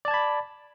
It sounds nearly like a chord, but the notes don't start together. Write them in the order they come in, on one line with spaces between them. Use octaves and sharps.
D5 A5 G#6 B5